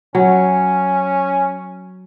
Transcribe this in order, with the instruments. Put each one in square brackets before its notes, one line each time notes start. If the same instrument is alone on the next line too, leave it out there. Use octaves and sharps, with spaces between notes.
[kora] F#3 [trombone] C#4